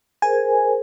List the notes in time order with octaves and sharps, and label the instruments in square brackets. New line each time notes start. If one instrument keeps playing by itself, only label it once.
[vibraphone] G#4 A#4 C5 [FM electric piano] G#5